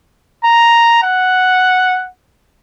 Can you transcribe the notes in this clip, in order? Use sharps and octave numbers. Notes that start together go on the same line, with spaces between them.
A#5
F#5